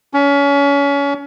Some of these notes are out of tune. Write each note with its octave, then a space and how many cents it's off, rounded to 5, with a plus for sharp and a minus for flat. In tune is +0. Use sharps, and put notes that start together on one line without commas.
C#4 +30